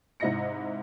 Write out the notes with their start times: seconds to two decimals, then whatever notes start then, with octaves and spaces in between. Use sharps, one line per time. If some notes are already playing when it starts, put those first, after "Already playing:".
0.20 G#2 C3 E4 D#5 A#6 C#7